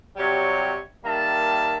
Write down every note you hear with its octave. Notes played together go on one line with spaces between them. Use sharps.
C3 F#3 G3 C#5
D#3 G3 A#3 E5 A5